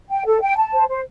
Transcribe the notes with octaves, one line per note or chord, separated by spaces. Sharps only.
G5
A4
G5
A5
C5
C5